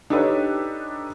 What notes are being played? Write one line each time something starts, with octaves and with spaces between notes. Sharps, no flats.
D4 D#4 G4 A4 B4 C#5